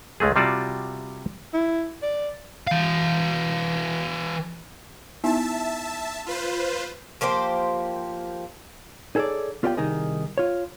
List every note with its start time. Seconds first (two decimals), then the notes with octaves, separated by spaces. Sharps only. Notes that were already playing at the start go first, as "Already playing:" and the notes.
0.20 C#2 G#3 A3 G#4
0.36 C3 G3 F4 F#4 D5 A5
1.54 E4
2.03 D5
2.67 E3 F5
5.24 B3 D#4 E4 E5 A5
6.26 F4 B4 C5
7.21 F3 A#3 G4 C5
9.15 D#4 G#4 A4 B4 C#5 D5
9.63 B3 F4 G4 D5 E5 G5
9.77 C2 D#3 D#4 G#4 D#5
10.38 F4 C#5